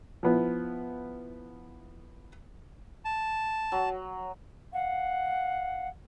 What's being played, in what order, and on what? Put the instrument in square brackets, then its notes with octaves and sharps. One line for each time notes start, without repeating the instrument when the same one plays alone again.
[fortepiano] F3 B3 E4
[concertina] A5
[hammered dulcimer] F#3
[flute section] F5 F#5